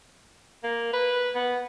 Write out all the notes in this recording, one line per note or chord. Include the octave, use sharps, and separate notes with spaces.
A#3
B4
B3